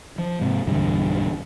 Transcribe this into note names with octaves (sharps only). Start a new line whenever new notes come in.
F3
G#2 C3
B1 E2 G2 D3